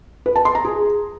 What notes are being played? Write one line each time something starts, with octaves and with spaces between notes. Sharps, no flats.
B4
A5
C6
A#5
G#4